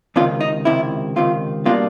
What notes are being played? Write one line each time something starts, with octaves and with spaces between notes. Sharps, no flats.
C#2 C3 D#3 F4
D#4
C#2 C3 D#3 E4
C#2 C3 D#3 F4
B2 G3 A#3 D4 F4